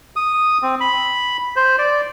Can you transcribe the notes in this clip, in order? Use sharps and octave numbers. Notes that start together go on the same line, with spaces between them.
D#6
C4
B5
C5
D5